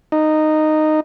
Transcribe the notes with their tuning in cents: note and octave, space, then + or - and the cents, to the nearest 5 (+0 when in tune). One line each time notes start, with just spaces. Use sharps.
D#4 -10